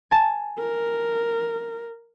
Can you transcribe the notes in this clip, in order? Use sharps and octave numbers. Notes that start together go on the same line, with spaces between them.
G#5 A5
A#4